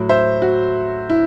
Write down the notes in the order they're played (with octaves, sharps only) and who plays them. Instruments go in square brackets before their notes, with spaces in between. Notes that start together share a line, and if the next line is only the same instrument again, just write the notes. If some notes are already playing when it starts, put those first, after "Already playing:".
Already playing: [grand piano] A2 F#3
C5 E5
F#4
E4